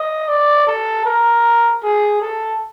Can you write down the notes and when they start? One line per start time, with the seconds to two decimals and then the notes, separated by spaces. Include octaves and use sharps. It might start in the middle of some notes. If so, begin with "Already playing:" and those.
Already playing: D#5
0.28 D5
0.67 A4
1.05 A#4
1.83 G#4
2.22 A4